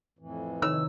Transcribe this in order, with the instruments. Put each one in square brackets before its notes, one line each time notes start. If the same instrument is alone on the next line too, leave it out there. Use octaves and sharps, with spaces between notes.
[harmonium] F2 A2 E3
[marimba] C3 D#3 [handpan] D#4 C#5 [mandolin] E6